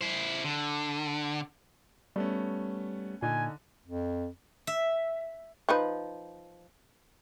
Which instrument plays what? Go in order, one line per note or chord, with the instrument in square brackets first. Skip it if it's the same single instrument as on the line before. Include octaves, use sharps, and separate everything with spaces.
[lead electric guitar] E4 C5
D3
[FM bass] G3 [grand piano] A3 B3 C#4
[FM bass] A#2 [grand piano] D3 D#4 [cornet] G#5
[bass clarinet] F2
[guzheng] E5
[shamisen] F3 D#4 B4